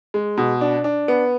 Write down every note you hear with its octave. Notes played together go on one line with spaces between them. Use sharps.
G#3
B2
D4
D4
B3